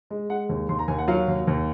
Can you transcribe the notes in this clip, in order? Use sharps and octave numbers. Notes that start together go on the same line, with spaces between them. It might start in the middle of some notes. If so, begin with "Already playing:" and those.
G#3
G#3 F#5
D#2
D#2 C6
A#5
D#2 G#5
F#5
F#3 F5
D#2
D#2